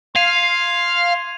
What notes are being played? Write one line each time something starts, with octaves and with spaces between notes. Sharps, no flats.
F5 C6 G#6 D#7 F7